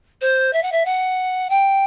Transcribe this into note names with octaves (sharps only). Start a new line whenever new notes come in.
C5
E5
F#5
E5
F#5
G5